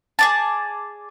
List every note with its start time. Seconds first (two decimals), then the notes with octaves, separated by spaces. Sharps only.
0.19 G#4 D5 A5